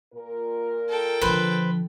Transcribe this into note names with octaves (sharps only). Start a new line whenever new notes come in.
A#2 A#4
A4 G5
D3 F3 B4 C5